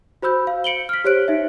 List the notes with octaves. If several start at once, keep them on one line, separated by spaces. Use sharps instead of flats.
F#4 C5 B5 E6 G6
F5
C#7 D7 F#7 G7
F6 B6
G4 C5 C#5 F#6 D7
D#4 E5